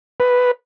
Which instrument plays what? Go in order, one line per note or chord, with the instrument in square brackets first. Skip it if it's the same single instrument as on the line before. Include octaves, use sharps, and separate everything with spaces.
[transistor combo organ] B4